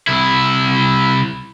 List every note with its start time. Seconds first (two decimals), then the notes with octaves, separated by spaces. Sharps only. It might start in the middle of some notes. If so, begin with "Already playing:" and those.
0.07 C2 E4